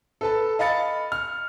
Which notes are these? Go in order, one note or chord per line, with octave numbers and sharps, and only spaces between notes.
A4 B4 A5
D#5 F5 B5 A6 C#7
F6